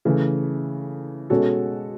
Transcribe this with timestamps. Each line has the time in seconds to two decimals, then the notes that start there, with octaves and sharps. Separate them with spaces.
0.05 C#3 E3 A3
1.30 B2 G#3 C#4 F#4 A4